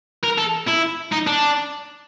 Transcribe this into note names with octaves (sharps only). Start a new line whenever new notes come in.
A#4
A4
E4
D#4
D4